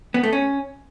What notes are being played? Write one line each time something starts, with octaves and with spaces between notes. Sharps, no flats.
B3
A3
C#4